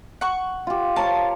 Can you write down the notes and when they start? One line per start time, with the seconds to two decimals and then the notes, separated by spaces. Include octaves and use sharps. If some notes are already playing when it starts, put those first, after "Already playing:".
0.21 F#5 C#6
0.67 F4 G4
0.96 A#4 C#5 F5 A5